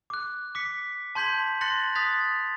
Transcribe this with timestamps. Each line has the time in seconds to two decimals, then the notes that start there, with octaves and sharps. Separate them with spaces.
0.10 D6 F#6
0.55 D6 B6 C#7
1.15 A5 C6 G6 G#6 B6 F#7
1.61 C6 F#6 A6 A#6 C#7 F#7
1.95 D#6 F#6 A6 B6 F7